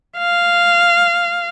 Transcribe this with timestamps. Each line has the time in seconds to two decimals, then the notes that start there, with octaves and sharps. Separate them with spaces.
0.18 F5